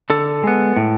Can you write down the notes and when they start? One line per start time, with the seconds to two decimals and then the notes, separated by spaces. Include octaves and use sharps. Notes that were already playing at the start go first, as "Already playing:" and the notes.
0.10 D3 A4
0.44 G#3 B3
0.77 A2